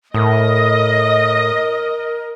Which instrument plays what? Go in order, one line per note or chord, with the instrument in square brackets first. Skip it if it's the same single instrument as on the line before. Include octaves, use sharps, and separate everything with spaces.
[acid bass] A2 [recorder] A#4 [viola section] D#5 [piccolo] D#6